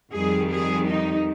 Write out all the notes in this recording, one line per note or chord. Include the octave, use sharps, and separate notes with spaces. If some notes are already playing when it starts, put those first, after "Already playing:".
F2 D#3 G3 G#4
G#4
D#4